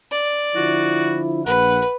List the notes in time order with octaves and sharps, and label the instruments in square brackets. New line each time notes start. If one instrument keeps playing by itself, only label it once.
[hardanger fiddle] D5
[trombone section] D3 F3 E4 [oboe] F#4
[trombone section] A#1 [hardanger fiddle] B4 [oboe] F#5